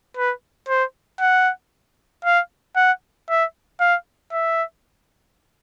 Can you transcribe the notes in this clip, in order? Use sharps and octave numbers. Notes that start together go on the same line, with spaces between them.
B4
C5
F#5
F5
F#5
E5
F5
E5